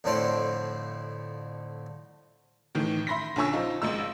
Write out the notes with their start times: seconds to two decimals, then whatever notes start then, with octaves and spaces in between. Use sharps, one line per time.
0.04 F2 A2 D3 A3 C5 G5
2.75 A2 D#3 E3
3.07 E5 B5 C6 A#6 B6
3.36 A#1 D3 C#4 G#5 C#6 E6
3.53 F3 D#4 F4
3.82 G#1 G#2 D#4 E6